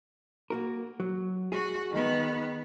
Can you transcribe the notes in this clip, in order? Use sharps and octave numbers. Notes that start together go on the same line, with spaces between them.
A#3 F#4 A#4
F#3
F#4 G#4
D#3 B3